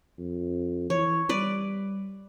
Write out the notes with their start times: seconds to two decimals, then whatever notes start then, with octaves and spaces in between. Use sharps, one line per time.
0.18 F2
0.90 E3 C#5
1.29 G3 B4 D5